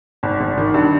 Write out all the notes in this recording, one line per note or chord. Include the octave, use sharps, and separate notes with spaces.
G#1
G#1
D#3
G2